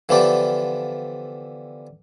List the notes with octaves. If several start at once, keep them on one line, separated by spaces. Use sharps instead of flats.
D3 E3 F3 B3 G4 D5